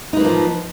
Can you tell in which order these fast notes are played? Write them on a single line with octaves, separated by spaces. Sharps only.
D#4 B4 A#3 F3